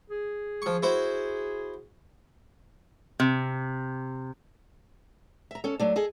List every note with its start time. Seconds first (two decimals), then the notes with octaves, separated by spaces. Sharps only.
0.09 G#4
0.62 F3 C#6
0.82 E4 F#4 C5
3.20 C3
5.51 E5 A#5
5.64 C#4 A4
5.80 F#3 A3 D4
5.96 G#4 A4 D#5